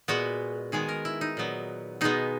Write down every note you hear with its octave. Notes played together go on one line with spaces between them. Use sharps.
A#2 G#3 B3 F#4
D#3 G#3 B3 G#4
A#4
E4
D#4
A#2 F#3 B3
B2 G#3 B3 D#4